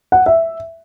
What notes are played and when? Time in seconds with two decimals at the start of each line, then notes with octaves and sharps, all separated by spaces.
0.12 F#5
0.26 E5